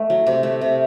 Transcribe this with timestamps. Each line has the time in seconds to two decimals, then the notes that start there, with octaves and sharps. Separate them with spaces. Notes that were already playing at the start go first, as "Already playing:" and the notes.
Already playing: A3
0.10 F#3
0.27 C3
0.43 A3
0.61 C3